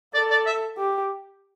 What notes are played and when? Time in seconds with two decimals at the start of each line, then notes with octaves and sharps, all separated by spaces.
0.14 A4 D5
0.31 D5
0.47 E5
0.78 G4